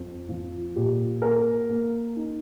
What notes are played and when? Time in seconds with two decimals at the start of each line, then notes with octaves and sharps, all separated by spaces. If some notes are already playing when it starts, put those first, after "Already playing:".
Already playing: F2
0.29 F3
0.76 A#2 G4
1.22 A#3 A#4
1.69 A#3
2.16 D#4